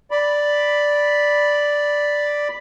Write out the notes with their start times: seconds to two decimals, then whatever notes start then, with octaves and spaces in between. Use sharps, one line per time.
0.11 D5 B5